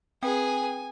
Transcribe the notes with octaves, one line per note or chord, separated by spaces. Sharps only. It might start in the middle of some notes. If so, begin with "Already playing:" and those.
C4 G#4 B4 G5 G#5